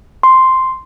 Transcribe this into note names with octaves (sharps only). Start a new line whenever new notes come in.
C6